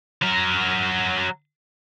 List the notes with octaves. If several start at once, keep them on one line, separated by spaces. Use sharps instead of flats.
F#3 A#4